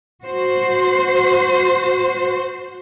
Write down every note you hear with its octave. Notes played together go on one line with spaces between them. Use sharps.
F#4 C5